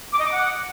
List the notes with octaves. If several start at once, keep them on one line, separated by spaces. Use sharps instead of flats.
D6
D#5
D6
F#5